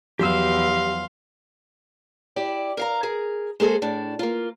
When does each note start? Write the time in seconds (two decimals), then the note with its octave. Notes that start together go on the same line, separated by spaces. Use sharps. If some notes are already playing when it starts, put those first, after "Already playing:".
0.19 E2 F3 F#3 G4 F5 C6 E6
2.36 E4 G4 D5
2.77 A#4 F5 A#5
3.03 G#4 A#4
3.60 G#3 A#3 G#4 A4 C5
3.82 A2 D4
4.19 A#3 F4